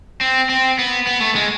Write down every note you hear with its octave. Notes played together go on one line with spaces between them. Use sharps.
C4
C4
B3
B3
A3
G#3